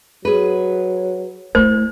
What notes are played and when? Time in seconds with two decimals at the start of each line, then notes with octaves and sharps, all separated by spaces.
0.25 F#3 G#4 B4
1.55 A3 E4 C5